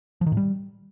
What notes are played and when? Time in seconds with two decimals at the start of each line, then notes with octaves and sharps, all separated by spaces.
0.21 F3
0.26 D#3
0.32 A2
0.37 G3